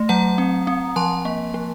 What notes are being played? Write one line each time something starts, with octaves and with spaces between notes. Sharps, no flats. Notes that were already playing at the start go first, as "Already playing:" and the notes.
Already playing: A3
F#3 F#5 A#5
C4
C4
F3 A5 C6
A#3
F3